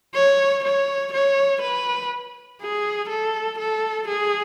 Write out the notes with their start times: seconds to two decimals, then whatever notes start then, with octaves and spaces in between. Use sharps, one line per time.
0.15 C#5
0.64 C#5
1.13 C#5
1.62 B4
2.61 G#4
3.09 A4
3.59 A4
4.08 G#4